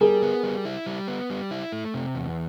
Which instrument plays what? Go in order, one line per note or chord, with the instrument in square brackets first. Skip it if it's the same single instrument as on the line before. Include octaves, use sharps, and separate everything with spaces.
[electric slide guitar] G3 [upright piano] G#4 A#4
[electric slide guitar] B3
G3
E4
G3
B3
G3
E4
A3
C3
E2